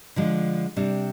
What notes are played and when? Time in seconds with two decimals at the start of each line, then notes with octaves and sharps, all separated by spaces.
0.16 D3 F3 G#3
0.76 C3 G3 D4